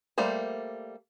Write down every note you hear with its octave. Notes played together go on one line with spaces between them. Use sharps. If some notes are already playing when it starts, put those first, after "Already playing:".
G3 A3 A#3 C5